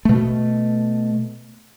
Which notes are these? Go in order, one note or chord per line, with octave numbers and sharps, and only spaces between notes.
B2 A3